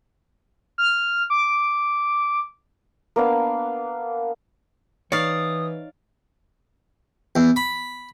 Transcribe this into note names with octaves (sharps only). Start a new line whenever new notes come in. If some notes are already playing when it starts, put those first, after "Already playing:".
F6
D6
A#3 B3 D4 F5
E3 D#4 C#5 D5 F5 D#6
E2
B5